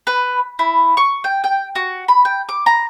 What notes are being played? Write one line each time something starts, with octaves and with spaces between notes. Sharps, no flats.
B4
E4
C#6
G5
G5
F#4
B5
G5
D6
A#5